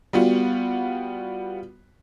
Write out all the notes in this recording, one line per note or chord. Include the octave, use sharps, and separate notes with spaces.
G3 B3 F4 F#4